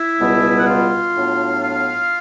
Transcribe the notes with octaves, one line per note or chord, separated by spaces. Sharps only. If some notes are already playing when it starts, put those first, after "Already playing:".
Already playing: E4 E5
C#2 B2 G3 B3
F#5
F4 F5
A2 F#3 B3 D4
F4 F5